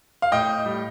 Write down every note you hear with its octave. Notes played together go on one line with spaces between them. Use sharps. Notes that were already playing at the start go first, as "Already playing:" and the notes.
F5
A2 D#5 G5
A2
G3